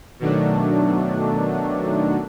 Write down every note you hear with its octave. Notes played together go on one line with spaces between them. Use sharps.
B2 D#3 F#3 A3 D4